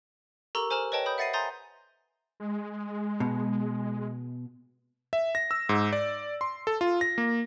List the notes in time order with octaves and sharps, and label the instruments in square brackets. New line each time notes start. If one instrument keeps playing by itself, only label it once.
[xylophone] G4 A4 A#4 A#5 C#6 E6
C5 G#5 A#5 F6 E7 F#7
B4 C#5 D#5 G5 A5
B5 D#6 G6
E5 F#5 A6 A#6 C7 D#7
G#5 A#5 C6 D#6 G6 A6
[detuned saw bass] G#3
[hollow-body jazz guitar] B2
[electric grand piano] E5
A#6
E6
G#2
D5
C6
A4
F4
A#6
A#3